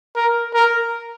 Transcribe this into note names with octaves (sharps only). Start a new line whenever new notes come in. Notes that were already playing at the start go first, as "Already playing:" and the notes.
A#4
A#4